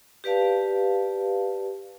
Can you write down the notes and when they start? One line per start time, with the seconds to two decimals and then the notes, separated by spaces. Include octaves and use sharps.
0.24 G4 B4 D5 F5 A5